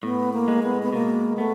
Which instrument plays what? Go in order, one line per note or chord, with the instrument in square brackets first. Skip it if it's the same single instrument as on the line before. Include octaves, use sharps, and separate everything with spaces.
[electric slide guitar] A2 [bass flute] B3
[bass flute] A#3
[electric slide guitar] G#3
[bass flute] B3
B3
[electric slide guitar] B2 [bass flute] A#3
[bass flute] A3 [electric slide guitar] B3